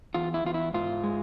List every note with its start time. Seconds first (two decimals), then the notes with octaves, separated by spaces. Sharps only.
0.14 E2 F4
0.34 E4
0.44 E2 F4
0.54 E4
0.74 G#2 F4
1.04 G#3